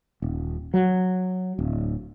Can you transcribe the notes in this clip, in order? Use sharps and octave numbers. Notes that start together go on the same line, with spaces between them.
D#1
F#3
D1